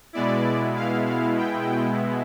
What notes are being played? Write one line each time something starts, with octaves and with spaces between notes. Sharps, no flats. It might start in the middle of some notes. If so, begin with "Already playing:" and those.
B2 G#3 B3 E4 D5
F5
F5
G5